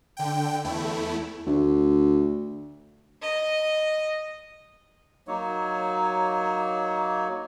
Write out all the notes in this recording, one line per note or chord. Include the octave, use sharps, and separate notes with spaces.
D3 G5
E2 A3 E4
D2
D#5
F#3 A#3 D#4 C#5